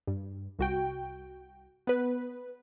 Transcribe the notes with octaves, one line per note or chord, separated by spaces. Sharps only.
G2
C2 F#4 G5
B3 B4